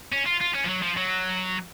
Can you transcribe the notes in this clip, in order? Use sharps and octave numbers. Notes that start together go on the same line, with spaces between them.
C#4
F4
F4
C#4
F3
F#3
F3
F#3